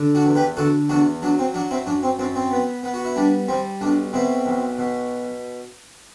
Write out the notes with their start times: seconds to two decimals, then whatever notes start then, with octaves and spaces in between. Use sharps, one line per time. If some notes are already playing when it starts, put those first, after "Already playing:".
Already playing: D3
0.15 D4 F#4
0.25 E2
0.36 G4 B4
0.57 D3 F#4 A4
0.89 E2 D4 F#4
1.22 F#3 D4
1.39 C4
1.54 F#3 D4
1.71 C4 E4
1.86 F#2 D4
2.03 C4
2.19 F#2 C4
2.36 C4
2.51 B3
2.83 B3
2.94 F#4
3.05 E4
3.16 G3 D4
3.48 G3 C4
3.81 B1 D4
4.13 B2 C4 E4
4.46 B1
4.79 B2